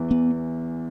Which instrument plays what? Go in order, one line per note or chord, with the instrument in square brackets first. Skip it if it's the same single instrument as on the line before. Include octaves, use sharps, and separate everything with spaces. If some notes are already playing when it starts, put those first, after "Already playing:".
Already playing: [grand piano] E2 E3
[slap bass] B3